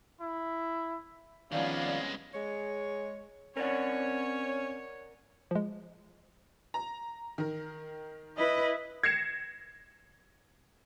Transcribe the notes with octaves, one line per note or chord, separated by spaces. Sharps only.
E4
C2 D#3 F3 G#3 B3 C#4 D5 F5
G#3 C#5
C4 C#4 A#4 C#5 D5 F#5
F3 G#3
A#5
D#3 A#4
E4 B4 D#5
G#6 A#6 C7 C#7 E7